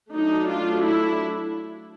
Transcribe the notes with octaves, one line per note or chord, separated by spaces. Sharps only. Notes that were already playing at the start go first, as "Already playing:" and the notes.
F#3 A3 D4 D#4
F4
E4